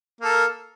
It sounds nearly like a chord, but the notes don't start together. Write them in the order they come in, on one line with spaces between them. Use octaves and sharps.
A#3 A4 A#4